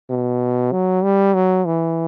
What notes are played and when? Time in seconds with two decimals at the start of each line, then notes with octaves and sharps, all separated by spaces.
0.10 B2
0.72 F#3
1.03 G3
1.34 F#3
1.65 E3